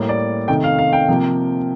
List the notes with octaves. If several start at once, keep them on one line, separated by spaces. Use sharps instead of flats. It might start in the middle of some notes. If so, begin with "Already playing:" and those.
Already playing: A2 G3 A#3
D5
C3 D#3 A3 G5
F5
F5
G5
C3 F3 A#3